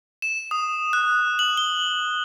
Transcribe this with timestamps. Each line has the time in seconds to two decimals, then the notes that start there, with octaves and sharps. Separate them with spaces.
0.22 E7
0.51 D#6
0.93 F#6
1.39 F#7
1.57 G7